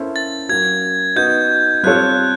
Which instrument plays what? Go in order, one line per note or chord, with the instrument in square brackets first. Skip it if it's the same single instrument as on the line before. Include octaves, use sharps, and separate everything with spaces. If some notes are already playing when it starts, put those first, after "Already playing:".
Already playing: [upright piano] A#3 C#4 E4 A4 C5
[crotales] A6
[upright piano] F#3 A#3 C#4 [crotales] G#6
[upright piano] B3 D#4 F#4 [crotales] G6
[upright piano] G3 C4 F4 A4 C#5 [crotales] F#6